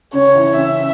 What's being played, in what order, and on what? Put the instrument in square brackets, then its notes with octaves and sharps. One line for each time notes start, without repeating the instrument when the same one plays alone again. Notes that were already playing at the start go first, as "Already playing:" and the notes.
[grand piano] C#3 C#4 [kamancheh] C#5
[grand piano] E3 E4
[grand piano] C#3 C#4 [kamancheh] E5